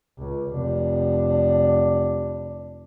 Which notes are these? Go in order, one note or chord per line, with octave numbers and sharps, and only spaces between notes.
C#2
F1 D4